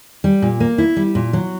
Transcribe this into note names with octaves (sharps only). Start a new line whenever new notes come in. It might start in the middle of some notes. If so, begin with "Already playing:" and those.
G3
A#2
A#3
E4
G3
A#2
F#3